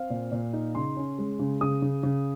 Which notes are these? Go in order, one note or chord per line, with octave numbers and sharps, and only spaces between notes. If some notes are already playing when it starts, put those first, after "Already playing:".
Already playing: C4 F5
A#2
A#2
D#4
C#3 C6
C#4
G#3
C#3
C#3 D#6
C#3
C#3